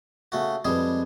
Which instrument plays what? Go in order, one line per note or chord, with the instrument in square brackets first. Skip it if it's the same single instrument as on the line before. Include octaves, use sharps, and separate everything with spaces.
[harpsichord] C#3 A3 F#4
[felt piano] F2 B4 [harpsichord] G3 G#3 G#4